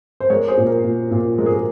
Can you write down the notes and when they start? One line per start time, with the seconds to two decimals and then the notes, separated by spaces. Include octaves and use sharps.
0.20 C5
0.30 G#3 A#4 C#5
0.48 G#4 C5
0.57 A#2
0.66 A#4
0.84 A#2
1.11 A#2
1.38 G#3 A#4
1.46 G#4
1.54 A#4